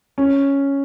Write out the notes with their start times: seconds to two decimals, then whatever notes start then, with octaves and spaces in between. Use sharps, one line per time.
0.18 C#4